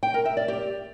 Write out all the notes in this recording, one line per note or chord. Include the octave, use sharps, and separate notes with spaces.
G5
A#4
E5
D5
G4